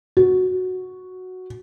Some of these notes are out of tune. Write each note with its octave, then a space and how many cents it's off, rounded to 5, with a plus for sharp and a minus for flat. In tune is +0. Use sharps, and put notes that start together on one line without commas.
F#4 +0